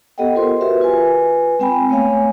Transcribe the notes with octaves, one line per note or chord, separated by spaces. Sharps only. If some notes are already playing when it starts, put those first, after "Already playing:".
B3 G4 A4 D#5 F#5 G5
F4 A#4 C5 C6
F#4 G4 A#4 B4 E5
F4 B4 G#5
G#3 C4 G5 G#5 B5
G#3 A3 B3 C#5 F5 G#5